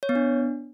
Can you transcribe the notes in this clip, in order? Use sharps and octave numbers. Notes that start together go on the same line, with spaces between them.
C#5
B3
D4